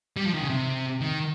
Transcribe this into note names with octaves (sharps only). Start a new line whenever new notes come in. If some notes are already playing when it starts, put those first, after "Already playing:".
G3
F3
D#3
C#3
C3
D#3